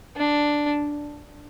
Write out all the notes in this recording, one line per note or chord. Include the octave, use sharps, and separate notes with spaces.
D4